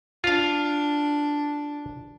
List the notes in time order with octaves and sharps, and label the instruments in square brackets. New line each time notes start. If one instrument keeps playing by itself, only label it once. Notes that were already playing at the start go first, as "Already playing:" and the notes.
[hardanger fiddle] D4 [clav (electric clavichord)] F4 F5